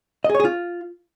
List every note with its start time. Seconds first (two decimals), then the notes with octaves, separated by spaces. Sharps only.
0.24 D#5
0.30 G#4
0.35 C#5
0.40 G#4
0.45 F4